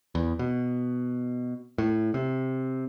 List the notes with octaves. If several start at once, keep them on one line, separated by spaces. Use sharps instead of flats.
E2
B2
A2
C3